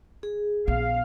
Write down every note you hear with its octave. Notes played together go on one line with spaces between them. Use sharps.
G#4
A#1 B3 F5